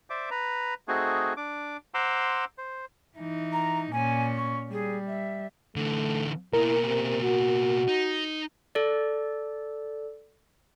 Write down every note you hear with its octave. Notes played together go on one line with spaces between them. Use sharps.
C5 D5 E5 D6
B4 A#5
A3 C4 D#4 F#4 G#4
D4 D6
C5 F#5 A#5 C6 D6 E6
C5
E3 D#4
A#5
A#2 C#4 G#5
C#6
G3 G#4
E5
D3 E3 A3
B2 A#3 E4 A#4
C3
F#4
D#4
A4 D5